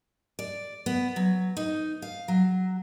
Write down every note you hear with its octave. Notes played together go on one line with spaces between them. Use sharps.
D5
B3
F#3
D#4
F5
F#3